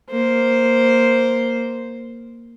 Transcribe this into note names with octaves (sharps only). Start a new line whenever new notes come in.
A#3 C5